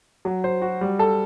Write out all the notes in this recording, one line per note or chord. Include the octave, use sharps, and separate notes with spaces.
F#3
C5
F#4
G3
A4